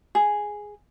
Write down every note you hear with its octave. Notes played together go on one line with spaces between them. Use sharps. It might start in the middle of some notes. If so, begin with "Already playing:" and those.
G#4